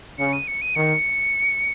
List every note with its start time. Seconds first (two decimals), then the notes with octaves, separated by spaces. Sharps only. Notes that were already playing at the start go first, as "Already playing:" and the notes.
0.18 C#3 C#7
0.33 D#7
0.48 C#7
0.62 D#7
0.75 D#3 C#7